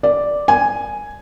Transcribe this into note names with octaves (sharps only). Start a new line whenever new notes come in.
D5
G#5